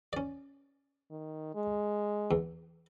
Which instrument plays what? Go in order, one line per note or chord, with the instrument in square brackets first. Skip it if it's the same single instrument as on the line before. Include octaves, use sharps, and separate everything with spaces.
[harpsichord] C#4 D5
[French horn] D#3
G#3
[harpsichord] E2